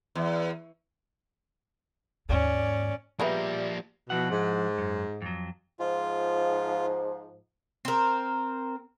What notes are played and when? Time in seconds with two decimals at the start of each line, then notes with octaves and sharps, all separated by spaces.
0.15 E2
2.29 D#2 G#2 C#4 D5
3.20 F3 G3 G#3 A#3 B3 B4 D5 E5
4.10 B2 F3 E4 F#5
4.28 G#2
4.78 F#2
5.22 F2 F#3
5.80 G#2 F3 F4
7.85 C4 A#4